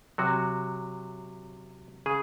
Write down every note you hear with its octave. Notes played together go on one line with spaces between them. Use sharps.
C3 F#3 F#4
C#3 G#4